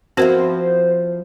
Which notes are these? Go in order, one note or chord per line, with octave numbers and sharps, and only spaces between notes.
F3 B3 C4 E4 F#4 A#4 C5